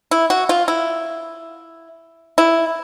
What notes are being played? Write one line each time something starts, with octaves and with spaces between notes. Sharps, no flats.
E4
F#4
F4
E4
E4